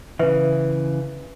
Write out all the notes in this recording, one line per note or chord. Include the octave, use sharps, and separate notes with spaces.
C#3 E3 B4 E5